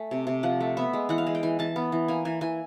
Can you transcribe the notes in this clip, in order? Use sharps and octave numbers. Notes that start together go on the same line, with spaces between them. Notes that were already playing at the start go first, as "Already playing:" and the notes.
Already playing: A3 G#5
C3
C3
F3 F#5
A3
B3 E5
G#3
E3 F#5
F5
G#3
G5
E3 G#5
E3 A5
B3
E3
A#3 G#5
E3 G#5
E3 G#5